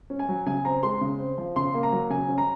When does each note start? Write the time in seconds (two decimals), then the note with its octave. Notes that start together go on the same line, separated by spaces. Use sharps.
0.10 C#4
0.19 G#5
0.29 F#3
0.46 C#3 G#5
0.65 C4 A#5
0.83 G#3 C6
1.01 C#3
1.19 C4
1.38 F3
1.56 C#3 C6
1.74 A#3
1.83 A#5
1.92 F#3
2.10 C#3 G#5
2.29 C#4
2.38 A#5